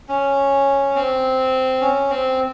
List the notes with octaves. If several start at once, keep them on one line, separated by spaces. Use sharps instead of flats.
C#4
C4
C#4
C4